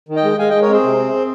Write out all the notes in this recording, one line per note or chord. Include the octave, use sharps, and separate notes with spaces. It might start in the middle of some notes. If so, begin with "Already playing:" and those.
D#3
D#5 G5
G#3
G#3 F5 G#5
G#3 D#5 G5
A#4 C#5
C4 G#4 C5
C3
C4
C4